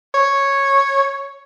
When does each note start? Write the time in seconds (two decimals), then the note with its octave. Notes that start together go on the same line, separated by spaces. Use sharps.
0.15 C#5